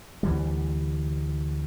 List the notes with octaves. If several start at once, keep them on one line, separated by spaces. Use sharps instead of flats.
D2 E3 G3